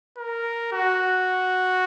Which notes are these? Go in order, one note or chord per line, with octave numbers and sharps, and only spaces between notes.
A#4
F#4